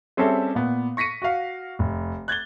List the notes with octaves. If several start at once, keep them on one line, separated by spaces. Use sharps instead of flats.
G3 C4 C#4 G#4 A4 E5
A#2 B3
C#6 A#6 B6 C#7 D#7
F#4 F5
F1
F#6 G#6 A6 G7